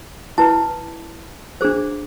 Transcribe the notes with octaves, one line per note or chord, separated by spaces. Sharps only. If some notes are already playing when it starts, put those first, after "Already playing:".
E4 B4 A5
D4 G#4 C5